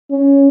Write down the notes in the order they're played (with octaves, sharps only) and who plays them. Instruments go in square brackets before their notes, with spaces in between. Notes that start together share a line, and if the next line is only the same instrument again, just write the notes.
[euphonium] C#4